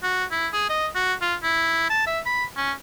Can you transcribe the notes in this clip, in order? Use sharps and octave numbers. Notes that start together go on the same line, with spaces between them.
F#4
E4
G#4
D#5
F#4
F4
E4
A5
E5
B5
C#4